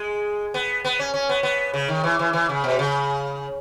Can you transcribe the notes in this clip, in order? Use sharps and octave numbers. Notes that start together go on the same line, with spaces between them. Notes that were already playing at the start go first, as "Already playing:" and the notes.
Already playing: G#3
B3
B3
C#4
C#4
B3
B3
C#3
D#3
E3
E3
E3
C#3
B2
C#3